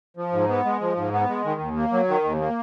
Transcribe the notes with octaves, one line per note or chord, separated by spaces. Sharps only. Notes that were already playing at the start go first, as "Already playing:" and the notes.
F3
G#2
B3
G#3
F3
G#2
B3
G#3
D#3
D#2
A#3
F#3
D#3
D#2
A#3